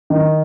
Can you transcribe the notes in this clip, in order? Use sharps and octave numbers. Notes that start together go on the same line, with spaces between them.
D#3